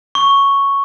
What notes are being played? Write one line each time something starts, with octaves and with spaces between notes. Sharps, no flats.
C#6